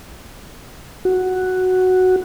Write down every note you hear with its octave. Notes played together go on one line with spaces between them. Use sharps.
F#4